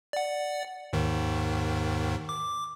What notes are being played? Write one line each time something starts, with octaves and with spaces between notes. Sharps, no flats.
D5 F#5
D#2 G#2 D#3
D6